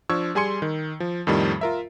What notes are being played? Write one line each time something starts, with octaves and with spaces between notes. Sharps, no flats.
F3 D4 C#6 E6 G#6
G3 G#4 G#5 C6 C#7
D#3
F3
F2 A2 D#3 G3
F4 A#4 E5